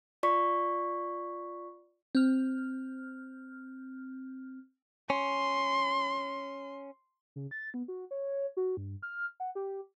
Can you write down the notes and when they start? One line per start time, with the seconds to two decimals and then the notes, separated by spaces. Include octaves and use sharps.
0.23 F4 D5 C#6 B6
2.15 C4 F6
5.10 C#4 C6
7.36 C#3
7.51 A6
7.74 B3
7.88 F#4
8.11 C#5
8.57 F#4
8.77 G2
9.02 F6
9.40 F#5
9.55 G4